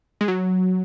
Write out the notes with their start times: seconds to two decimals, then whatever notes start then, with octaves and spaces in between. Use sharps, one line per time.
0.21 G#3
0.28 F#3